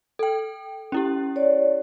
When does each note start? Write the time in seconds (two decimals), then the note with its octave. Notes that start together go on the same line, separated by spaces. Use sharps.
0.19 A4 G5
0.92 C#4 E4 G4
1.36 C#5 D5